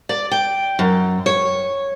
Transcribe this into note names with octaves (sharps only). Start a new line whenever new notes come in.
D5
G5
F#2
C#5